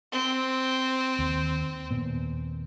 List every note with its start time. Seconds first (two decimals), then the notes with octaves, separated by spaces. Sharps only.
0.12 C4
1.19 D#2
1.91 D#2 A#2 B3